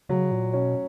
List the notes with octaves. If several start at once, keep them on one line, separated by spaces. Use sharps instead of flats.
C#3 F#3
A#2
B2 C#4